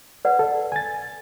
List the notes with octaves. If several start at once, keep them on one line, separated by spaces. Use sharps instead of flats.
B4 D5 F#5
A4
G#5 A6